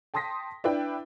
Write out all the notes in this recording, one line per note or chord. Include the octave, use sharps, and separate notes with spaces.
G5 A5 C6 D#6 A#6 B6
D4 E4 B4 G5